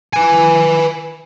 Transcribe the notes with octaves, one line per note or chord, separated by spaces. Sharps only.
B4 G#5